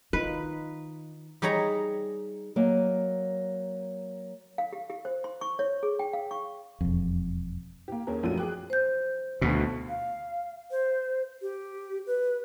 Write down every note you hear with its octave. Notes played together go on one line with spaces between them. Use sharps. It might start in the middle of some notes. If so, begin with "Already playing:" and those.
D#3 D#4 F4 B4
G3 D#4 G#4 C#5 A#5
F#3 A#3 D#5 G#5
F5
G4
G4
C5
C6
C#6
C#5
G#4
G5
F5
C#6
E1 F2
A#3 G4
D#2 C#4 G#4 A#4
A#1 F#2 F3 F#3 A3 D#7
G#4 G5 D6 F#6
C5 G6
D2 B2
F5
C5
G4
B4